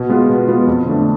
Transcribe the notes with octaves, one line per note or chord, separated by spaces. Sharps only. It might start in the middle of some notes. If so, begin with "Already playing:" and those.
Already playing: B2
G#3 B3 F4
B2
G#3 B3 F4
F2
D3 A3 D4